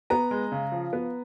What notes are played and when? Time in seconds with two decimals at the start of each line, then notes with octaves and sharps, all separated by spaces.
0.10 B3 A#5
0.31 G#3
0.52 C#3
0.72 F3
0.93 B3